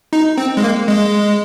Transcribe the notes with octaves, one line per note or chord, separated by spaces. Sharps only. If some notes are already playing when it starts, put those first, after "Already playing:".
D#4
C4
G#3
A#3
G#3